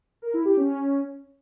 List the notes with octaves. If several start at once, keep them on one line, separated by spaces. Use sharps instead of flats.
A#4
E4
G4
C#4